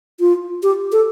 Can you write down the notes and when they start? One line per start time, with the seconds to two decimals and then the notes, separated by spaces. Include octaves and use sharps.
0.20 F4
0.63 G4
0.92 A4